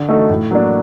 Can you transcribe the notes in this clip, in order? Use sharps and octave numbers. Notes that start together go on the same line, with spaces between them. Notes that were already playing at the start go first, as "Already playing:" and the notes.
Already playing: D3
A3 D#4 F#4 A4
A2
F#3 A#3 D4